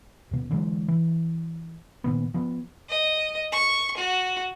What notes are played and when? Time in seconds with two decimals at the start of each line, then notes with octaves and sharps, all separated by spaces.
0.31 D#2 B2
0.51 D3 E3 F#3 G#3
0.88 E3
2.04 A#2 D#3 B3
2.34 F3 B3
2.89 D#5
3.52 C#6
3.97 F#4